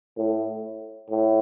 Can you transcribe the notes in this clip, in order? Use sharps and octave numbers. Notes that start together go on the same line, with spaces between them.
A2
A2